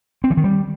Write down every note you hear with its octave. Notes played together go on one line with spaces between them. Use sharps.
C4
E3
D#3
G3